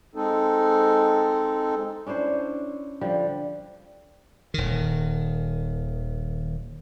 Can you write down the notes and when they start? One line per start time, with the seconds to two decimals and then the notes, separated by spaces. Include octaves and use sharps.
0.15 G#3 C4 D#4 A4
2.06 C#4 D4 E4 C5
3.01 D3 F3 G3
4.54 D#1 D#3